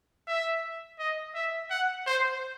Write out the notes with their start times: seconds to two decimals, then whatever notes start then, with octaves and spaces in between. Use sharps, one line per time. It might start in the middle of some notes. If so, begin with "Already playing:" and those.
0.27 E5
0.99 D#5
1.35 E5
1.70 F#5
2.06 C5